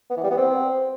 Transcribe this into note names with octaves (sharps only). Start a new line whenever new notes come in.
B3
E3
G3
B3
C4